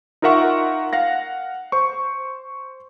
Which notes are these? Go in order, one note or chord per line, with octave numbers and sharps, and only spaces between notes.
D#4 F4 A#4 E5 F#5 C#6
F5 F#5 A#6
C5 C#6